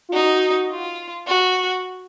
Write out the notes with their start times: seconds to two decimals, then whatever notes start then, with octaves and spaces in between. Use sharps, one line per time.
0.09 F4
0.13 D#4 F#4
0.71 F4
1.27 F#4